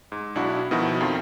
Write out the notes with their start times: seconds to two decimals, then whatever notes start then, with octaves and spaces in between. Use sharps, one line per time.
0.12 G#2
0.35 B1 D4 E4 F#4
0.71 B2 D#3 F3 E4 F#4
1.01 F2 D#3 F4